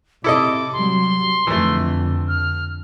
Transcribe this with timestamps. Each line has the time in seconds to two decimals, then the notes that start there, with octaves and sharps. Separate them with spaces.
0.24 C3 E4 A4 D#5 D6
0.73 F#3 G3 C6
1.47 F2 D3 E3 A3
2.28 F6